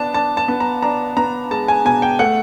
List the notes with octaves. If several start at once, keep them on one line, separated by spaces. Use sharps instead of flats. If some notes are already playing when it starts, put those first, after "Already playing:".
Already playing: B3 D4 A5
D4 A5
A5
B3
A#5
D4 A#5
B3 A#5
G#3 A5
G#5
B2 G#5
G5
A3 F#5